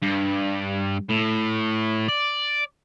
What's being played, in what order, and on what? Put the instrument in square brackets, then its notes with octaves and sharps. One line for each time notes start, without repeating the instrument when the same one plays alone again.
[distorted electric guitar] G2
A2
D5